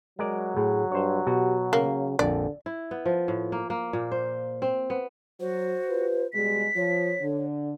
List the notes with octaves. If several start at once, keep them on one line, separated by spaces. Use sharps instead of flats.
F#3 G#3 A#4 D5
A2 G#4
G2 C5 C#5
B2 F#4 G4
C#3 A#3
A#1 F2 D3 D5
E4
B3
F3
A2
A#3
A#3
A#2
C5
C4
B3
F#3 F#4 C5
F4 G4 B4
B2 G3 G#3 B6
F3 C#5
D3